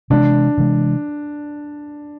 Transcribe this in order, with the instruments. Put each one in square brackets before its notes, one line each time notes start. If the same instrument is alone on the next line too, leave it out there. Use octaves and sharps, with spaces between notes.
[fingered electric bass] C3 E3 G#3 [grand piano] D4
[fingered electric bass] C3 E3 G#3